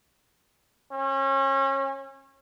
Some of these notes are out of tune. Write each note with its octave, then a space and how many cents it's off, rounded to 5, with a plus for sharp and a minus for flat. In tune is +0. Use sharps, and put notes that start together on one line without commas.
C#4 -30